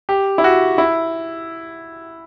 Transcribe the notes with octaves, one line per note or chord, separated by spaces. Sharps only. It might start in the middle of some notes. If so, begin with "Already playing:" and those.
G4
E4
F#4
E4